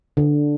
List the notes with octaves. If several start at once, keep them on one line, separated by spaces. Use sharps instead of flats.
D3